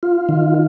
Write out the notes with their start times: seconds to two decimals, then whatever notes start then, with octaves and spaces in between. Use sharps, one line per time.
0.03 F4
0.29 D#3